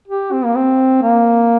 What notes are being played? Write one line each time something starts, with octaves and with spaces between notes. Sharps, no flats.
G4
C4
A#3
C4
A#3